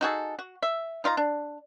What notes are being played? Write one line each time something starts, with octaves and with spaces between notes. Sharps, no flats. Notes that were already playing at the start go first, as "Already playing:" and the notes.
D#4 F#4 G#4 A4
F#4
E5
D#4 F4 E5 A#5
D4